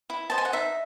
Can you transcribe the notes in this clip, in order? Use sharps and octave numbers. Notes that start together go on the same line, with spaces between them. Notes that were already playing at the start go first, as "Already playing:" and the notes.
E4
C5 D#5 A5
G#5
F#5
D#4 E5